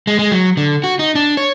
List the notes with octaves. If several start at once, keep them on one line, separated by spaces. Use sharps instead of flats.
G#3
G#3
F#3
D3
F#4
D#4
D4
C#5